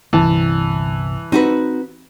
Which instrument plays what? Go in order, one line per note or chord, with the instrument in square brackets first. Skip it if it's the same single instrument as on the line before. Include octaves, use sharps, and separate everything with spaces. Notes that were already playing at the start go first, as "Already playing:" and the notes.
[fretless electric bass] G1 C2 [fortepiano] E3 A5
[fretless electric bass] C4 [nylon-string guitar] D#4 F#4 B4